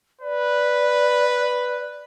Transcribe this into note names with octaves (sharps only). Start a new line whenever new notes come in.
B4 D5